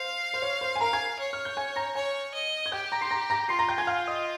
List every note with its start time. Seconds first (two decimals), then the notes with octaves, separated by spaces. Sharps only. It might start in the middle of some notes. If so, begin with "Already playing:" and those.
Already playing: C5 F5
0.34 C5
0.42 C#5
0.61 C5
0.76 G#5
0.80 A#4 F5 A#5
0.93 G#5 G#6
1.19 C#5
1.33 F6
1.45 G6
1.57 G#5 G#6
1.76 A#5 A#6
1.95 C#5 G#5 G#6
2.34 D#5
2.66 G#6
2.72 G4 G5 G6
2.92 A#5 A#6
3.01 C6 C7
3.11 A#5 A#6
3.30 A#5 A#6
3.49 F4 C6 C7
3.59 A#5 A#6
3.68 G5 G6
3.78 G#5 G#6
3.87 F5 F6
4.08 D#5 D#6